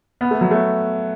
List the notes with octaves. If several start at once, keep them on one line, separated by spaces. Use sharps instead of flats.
B3
A3
F#3
A3